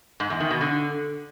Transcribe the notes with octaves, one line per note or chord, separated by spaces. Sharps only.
G#2
E2
D#3
B2
D3